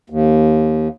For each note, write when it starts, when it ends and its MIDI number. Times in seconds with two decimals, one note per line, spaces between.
0.10 0.88 39